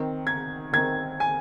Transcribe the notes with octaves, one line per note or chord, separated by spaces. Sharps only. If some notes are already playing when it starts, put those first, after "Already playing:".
Already playing: D#3 C4
G#6
D#3 C4 G#6
G#5